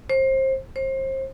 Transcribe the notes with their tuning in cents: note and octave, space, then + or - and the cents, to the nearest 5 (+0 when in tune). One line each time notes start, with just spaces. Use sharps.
C5 +25
C5 +30